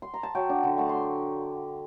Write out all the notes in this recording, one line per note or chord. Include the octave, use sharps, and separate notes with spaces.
C6
A#5
A5
F#3 G5
D4
D3
A3 A5
C6